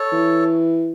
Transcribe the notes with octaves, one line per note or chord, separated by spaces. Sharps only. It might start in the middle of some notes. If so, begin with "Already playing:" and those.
Already playing: A4 C#5
E3